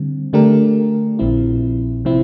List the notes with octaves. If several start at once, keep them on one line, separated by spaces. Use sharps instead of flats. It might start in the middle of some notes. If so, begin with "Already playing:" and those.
Already playing: D3 G3 C4
D3 A3 D4 G4 A#4
A#1 A#2 F3 C4 E4
C3 F3 C4 E4